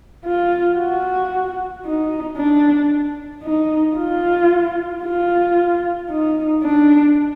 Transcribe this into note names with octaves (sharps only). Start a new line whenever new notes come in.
F4
F#4
D#4
D4
D#4
F4
F4
D#4
D4